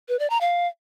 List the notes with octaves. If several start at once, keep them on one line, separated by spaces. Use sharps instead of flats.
B4
D5
A#5
F5